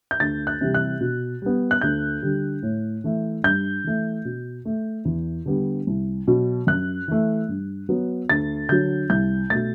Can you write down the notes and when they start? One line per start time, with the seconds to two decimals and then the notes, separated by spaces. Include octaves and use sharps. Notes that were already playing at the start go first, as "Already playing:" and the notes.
0.11 G6
0.20 D2 A6
0.47 F#6
0.61 C3 E3 G3
0.74 F#6
1.01 B2
1.42 G3 B3
1.71 F#6
1.81 D2 G6
2.22 D3 G3
2.63 A2
3.04 E3 A3
3.44 G2 G6
3.84 E3 A3
4.25 B2
4.65 A3
5.05 E2
5.46 D3 G3 B3
5.87 C2
6.27 B2 F#3
6.67 F#2 F#6
7.08 E3 A3
7.49 G2
7.89 F#3 B3
8.29 D2 A6
8.69 D3 F#3 G6
9.10 C2 G6
9.50 B2 A3 A6